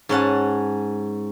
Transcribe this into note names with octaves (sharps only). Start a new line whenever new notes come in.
G#2 C#4 F#5 A5